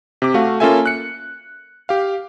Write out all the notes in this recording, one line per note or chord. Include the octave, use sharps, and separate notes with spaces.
C3 D6
A3 F#4 F5
A#3 C#4 F4 A4 E5 G#5
F#6 C#7
G4 F5